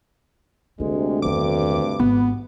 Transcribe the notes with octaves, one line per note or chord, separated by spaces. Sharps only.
D2 C3 G#3 A#3
E2 G2 D#3 D6
G#1 B3